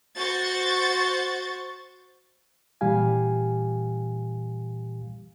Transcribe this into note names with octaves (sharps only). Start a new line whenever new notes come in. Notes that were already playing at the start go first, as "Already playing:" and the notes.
F#4 C5 C#6 G6 A6
A#2 E3 G3 G4 F5 G#5